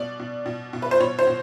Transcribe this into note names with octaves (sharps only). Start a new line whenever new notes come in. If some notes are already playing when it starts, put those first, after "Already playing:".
Already playing: B2 D5
B2
B2
B2
B4
C5
B2 C#5
C5
B2